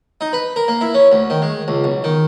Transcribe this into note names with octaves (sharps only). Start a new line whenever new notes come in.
D#4
B4
A#4
A#3
E4
C#4
D2
D#3
G#3
C#2
B1
D#3